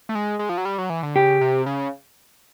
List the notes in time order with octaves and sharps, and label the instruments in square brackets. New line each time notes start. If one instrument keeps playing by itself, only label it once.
[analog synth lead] A3
G#3
G#3
F3
F#3
G3
F#3
E3
D3
[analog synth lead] C#3 [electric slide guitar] G4
[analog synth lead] C3
C#3